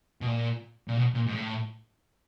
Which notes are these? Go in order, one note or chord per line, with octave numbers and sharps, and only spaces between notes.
B2
A#2
A#2
B2
A#2
G#2
A2